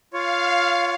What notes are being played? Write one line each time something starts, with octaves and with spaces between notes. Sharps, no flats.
F4 C#5 F5